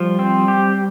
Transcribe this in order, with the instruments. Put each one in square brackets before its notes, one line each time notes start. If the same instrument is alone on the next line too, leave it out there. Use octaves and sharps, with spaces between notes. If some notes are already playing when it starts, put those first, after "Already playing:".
Already playing: [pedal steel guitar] F3 [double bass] G3
[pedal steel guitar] C4
G4